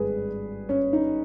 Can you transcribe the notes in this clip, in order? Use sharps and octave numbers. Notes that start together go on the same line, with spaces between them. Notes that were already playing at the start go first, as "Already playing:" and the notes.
Already playing: G#1 G2 G3 G#4 B4
C#4
D#4